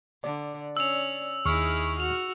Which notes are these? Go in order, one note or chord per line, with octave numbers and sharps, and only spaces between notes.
D3 D5
C#4 E6 F7
D#2 D#4 E4 G#4 C#6 F6
F#4 F7